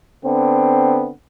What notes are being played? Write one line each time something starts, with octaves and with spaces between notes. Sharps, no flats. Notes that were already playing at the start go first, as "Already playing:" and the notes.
D3 B3 C4